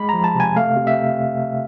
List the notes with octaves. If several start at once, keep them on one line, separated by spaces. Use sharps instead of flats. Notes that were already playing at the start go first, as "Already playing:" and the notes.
Already playing: G#3 B5
F3 A#5
A5
C3 G#5
A3 F5
C3
E5